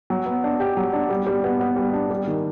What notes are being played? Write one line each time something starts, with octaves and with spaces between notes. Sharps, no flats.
F#3
B3
D4
G4
F#3
D4
G3
G3
B3
B3
G3
D4
G3
D#3